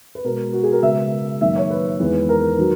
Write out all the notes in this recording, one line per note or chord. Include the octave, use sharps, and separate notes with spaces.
B4
B2 G#3 B3 A#4
F#4
G#4
A#4
C#3 G#3 B3 E5
F#2 D#3 A#3 E5
C#5
B4
E2 D#3 G#3 B3
A#4
D#3 F#3